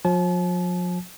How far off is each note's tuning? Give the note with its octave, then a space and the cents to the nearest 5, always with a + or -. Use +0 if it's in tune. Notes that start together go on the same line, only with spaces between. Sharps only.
F3 +40 A5 -40